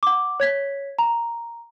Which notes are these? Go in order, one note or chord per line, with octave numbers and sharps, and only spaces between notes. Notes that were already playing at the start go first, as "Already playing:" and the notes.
F#5 D6
C#5 G#6 B6
A#5